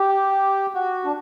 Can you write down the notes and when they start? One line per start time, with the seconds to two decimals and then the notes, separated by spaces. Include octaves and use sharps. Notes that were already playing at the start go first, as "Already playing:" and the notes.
Already playing: G4
0.75 F#4
1.05 D4